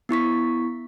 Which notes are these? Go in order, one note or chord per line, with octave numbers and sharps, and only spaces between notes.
B3 E4 C#6 B6